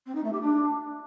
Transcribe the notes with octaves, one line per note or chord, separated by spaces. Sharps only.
C4
D#4
A3
G4
D4